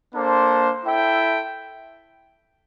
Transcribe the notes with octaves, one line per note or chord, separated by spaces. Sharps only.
A#3 D4 A4 C5
E4 A4 E5 G5